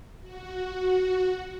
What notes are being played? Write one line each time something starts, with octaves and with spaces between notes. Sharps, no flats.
F#4
F#4